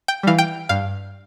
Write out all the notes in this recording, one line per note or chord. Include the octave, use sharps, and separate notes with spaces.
G5
E3 G3 F5
G5
G2 F5